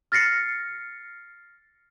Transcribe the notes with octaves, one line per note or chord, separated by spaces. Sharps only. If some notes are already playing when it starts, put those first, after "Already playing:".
F6 A6 A#6 C7 C#7